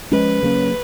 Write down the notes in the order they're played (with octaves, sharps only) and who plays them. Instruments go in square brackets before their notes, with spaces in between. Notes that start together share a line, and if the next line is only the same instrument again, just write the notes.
[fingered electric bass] F3 G#3 C#4 [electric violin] B4
[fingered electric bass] C#3 F#3 A#3 C#4